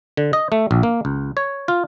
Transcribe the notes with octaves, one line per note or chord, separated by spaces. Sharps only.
D3
D#5
A3
A#1
A#3
C#2
C#5
F4